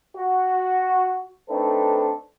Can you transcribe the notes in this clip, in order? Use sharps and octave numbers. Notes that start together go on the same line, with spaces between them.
F#4
A3 C4 D4 D#4 A4 B4